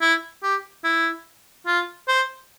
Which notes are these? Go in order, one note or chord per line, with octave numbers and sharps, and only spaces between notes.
E4
G4
E4
F4
C5